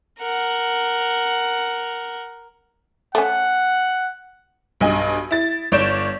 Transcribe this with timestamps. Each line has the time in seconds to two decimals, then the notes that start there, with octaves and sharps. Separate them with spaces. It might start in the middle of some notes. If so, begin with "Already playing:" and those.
0.19 A#4 F#5
3.15 A3 C#4 F#5
4.81 B1 G2 D#5 G#5
5.31 E4 A6
5.72 G1 C#5 D5 G6 D7 E7